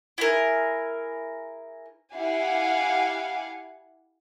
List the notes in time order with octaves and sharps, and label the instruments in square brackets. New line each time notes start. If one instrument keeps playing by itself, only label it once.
[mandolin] E4 G#4 A#4
[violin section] E4 G4 F5 F#5 G#5